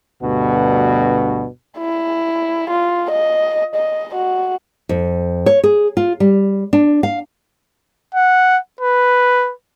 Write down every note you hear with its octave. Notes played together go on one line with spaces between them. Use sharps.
D2 G2 B2 D4 F#4
E4
F4
D#5
D#5
F#4
F2
C#5
G#4
F4
G3
D4
F5
F#5
B4